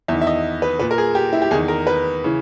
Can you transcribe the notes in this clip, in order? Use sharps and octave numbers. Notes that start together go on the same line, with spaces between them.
E2 D#3 E5
E5
D#5
B4
A#2 B4
A#4
G#4
G4
E4
G4
E2 D#3 G#4
A#4
B4
C#3 E3